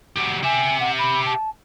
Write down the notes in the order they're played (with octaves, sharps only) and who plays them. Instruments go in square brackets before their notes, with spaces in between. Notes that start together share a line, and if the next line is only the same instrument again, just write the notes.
[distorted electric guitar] F#3 G4
[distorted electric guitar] G4 E5 [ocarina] G#5
[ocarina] F#5
B5
A5